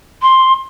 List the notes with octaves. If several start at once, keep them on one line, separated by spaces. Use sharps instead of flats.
C6